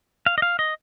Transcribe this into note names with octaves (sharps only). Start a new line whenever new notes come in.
F5
D#5
F5
D#5